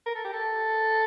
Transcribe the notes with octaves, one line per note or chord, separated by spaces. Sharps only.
A#4
A4
G4
A4